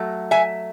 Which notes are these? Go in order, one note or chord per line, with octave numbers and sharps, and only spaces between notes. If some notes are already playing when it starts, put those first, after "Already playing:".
Already playing: F#3 A3
E5 G#5